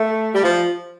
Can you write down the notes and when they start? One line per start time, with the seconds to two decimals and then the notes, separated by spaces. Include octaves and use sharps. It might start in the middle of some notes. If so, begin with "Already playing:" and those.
Already playing: A3
0.34 G3
0.44 F3